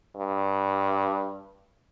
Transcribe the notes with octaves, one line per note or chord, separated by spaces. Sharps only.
G2